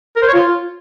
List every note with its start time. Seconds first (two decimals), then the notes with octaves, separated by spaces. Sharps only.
0.17 A#4
0.22 C5
0.28 C#5
0.33 F4